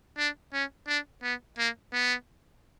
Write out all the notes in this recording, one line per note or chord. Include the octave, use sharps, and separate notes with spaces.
D4
C#4
D4
B3
A#3
B3